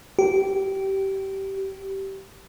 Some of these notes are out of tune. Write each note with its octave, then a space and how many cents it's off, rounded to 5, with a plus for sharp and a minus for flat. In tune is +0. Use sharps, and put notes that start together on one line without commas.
G4 -20